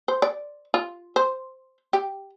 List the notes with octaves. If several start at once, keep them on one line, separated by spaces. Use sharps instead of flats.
C5
D5
F4
C5
G4